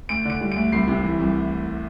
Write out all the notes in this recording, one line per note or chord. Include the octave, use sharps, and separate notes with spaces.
D2 D7
D3 D7
G3
D2 D7
C2 C7
C3
E3
C2